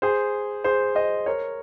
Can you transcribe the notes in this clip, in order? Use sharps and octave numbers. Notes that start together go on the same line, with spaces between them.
G#4 C5
G#4 C5
C5 D#5
A#4 C#5